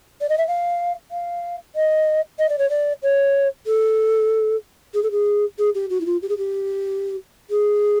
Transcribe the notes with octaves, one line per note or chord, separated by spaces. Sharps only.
D5
D#5
E5
F5
F5
D#5
D#5
D5
C#5
D5
C#5
A4
G#4
A4
G#4
G#4
G4
F#4
E4
F4
G4
G#4
G4
G#4